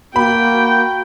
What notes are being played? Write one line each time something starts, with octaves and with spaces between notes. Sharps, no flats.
A#3 F#4 G5 B5